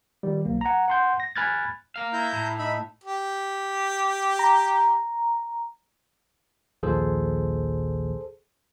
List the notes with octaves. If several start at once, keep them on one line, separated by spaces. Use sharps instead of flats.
D#3 G3
B1 A#3
F#5 A#5
F#5 C6 G6
A#6
G#5 B5 F6 F#6 G#6 A6
A#4 F5
E4 A#5 G6
A2
D#4 E5 B5
G4
A#5
A#1 D#2 F3 G#4 A4 C5